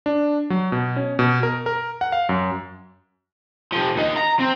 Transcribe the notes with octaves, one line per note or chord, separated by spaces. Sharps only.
D4
F#3
B2
C#4
B2
A#4
A#4
F#5
F5
F#2
C3 F3
D#2 D#4
A#5
C4